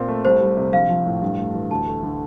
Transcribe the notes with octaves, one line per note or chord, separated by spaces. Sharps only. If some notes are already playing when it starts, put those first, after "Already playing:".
Already playing: A#2 C4
A3
C2 C5
G3
C3
A#1 F5
F3
A2
G2
A3
E3
D2 A5
A3
D3